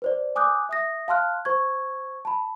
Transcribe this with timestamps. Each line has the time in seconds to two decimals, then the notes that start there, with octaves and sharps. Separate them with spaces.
0.02 B4 C5 D5
0.36 G#5 D6 D#6 F#6 G6
0.69 E5 D#6 A#6
1.08 F5 A5 C6 F6 F#6
1.45 C5 C#6 G#6
2.25 A5 B5